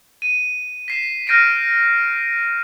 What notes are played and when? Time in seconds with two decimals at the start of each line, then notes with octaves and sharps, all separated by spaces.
0.22 D#7
0.88 B6 C7 E7
1.27 F6 G6 A#6 C7 D7 D#7